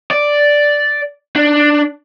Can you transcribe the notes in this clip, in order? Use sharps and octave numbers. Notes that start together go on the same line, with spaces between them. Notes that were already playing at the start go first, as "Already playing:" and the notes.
D5
D4